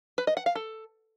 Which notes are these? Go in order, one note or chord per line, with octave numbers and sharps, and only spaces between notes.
B4
D#5
F#5
F5
A4